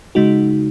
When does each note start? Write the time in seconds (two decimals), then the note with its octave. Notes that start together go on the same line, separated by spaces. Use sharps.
0.15 C#3 G#3 D#4 F#4